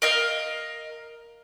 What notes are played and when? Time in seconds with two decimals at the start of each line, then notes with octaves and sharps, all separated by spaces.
0.02 A#4 D#5 F5